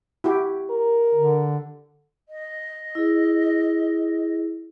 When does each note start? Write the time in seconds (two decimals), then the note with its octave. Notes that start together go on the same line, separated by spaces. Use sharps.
0.24 E4 F#4 G4
0.70 A#4
1.15 D3
2.29 D#5
2.95 E4 G#4